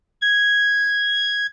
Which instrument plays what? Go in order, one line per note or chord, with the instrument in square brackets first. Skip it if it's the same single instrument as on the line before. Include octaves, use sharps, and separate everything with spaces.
[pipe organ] G#6